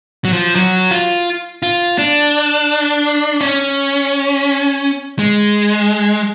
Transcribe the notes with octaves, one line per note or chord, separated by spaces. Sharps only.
F#3
F3
F#3
F4
F4
D4
C#4
G#3